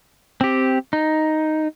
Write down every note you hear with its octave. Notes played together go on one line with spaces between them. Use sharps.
C4 G4
D#4